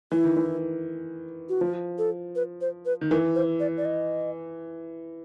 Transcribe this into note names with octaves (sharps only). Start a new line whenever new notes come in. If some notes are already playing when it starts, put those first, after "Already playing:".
E3 E4
D#3
E3
F#4
F3 F4
A4
B4
C5
B4
D#3
E3 A#4
C5
D5
D5
D#5